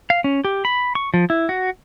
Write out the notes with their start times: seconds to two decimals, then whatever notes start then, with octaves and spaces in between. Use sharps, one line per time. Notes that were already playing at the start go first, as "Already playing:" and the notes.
0.10 F5
0.24 C#4
0.45 G4
0.65 B5
0.95 C#6
1.14 F3
1.30 E4
1.49 F#4